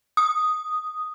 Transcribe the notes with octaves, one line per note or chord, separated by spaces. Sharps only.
D#6